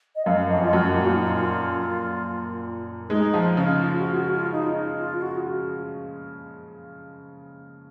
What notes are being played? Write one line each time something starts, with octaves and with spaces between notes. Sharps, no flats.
D#5
F#2 F5
F2 D#5
F4
F#2 F#4
A#2 F#4
F4
D#4
F4
G#3 D#4
F3
C#3
F4
F#4
F#4
F4
D#4
F4
F4
F#4